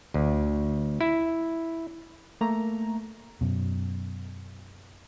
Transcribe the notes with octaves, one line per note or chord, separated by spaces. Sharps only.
D2
E4
A3 A#3 A#5
F#2 B2